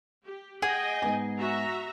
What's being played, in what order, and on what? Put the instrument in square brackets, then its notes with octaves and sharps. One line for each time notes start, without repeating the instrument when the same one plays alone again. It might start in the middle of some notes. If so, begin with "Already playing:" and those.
[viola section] G4
[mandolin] G#4 [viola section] D#5 G5 [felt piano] F#5
[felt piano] G#2 B3 G#5
[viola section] F#4 E5 A#5